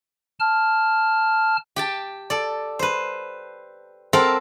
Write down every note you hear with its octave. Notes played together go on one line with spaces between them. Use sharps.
A5 F6
G4 G5 A5
A4 D5
B4 C5
C4 A4 A#4 C5 F5 F#5